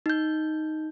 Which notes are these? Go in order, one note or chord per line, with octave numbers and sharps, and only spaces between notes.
D#4 G6